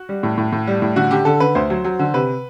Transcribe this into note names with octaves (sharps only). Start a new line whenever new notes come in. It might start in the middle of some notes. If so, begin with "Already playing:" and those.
Already playing: F#4
G3
A2
A2
A2
G3
A2
D3 F#4
D3 G4
D3 A4
D3 B4
D2 C5
F#3
F#3
D3
C3 B4